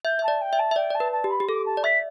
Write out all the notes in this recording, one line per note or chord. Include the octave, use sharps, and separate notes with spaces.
E5 G6
E5 A5
D5
G5
E5
A5
E5
D5 G5
D5 A5
B4
A5
G4
B5
G4
A4 D6
A5
D5
E5 B6